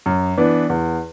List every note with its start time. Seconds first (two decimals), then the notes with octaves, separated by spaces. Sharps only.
0.06 F#2
0.38 E3 B3 D4
0.70 E2